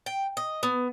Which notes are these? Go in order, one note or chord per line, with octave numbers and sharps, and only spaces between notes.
G5
D#5
B3